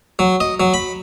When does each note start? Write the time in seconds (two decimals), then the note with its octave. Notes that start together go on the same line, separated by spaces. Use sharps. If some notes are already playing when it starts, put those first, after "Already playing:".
0.19 F#3
0.40 D#5
0.60 F#3
0.74 B5